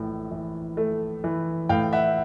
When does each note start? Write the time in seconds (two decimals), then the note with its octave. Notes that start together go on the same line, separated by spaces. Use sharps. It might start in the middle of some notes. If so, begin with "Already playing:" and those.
Already playing: A#1 A2 E3
0.31 E3
0.77 A3
1.24 E3
1.69 A2 F5 G5
1.93 E5 F#5